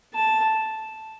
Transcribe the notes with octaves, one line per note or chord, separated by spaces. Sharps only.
A5